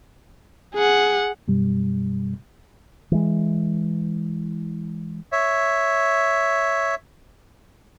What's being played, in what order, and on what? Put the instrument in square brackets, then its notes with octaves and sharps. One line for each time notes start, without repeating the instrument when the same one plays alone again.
[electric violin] G#4 F#5
[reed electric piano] F#2 B2 G3
[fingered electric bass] E3 G#3
[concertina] C#5 E5